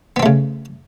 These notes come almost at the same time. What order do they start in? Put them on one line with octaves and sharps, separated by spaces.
B3 C4 A3 C#3